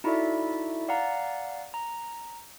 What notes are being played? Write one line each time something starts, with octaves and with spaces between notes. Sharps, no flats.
D#4 E4 F#4 A4 D5 E5
D5 F5 F#5 A#5
A#5